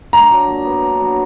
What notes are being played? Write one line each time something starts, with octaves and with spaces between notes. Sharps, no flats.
D4 A#5
F#3
A#2
B3
D4
F#3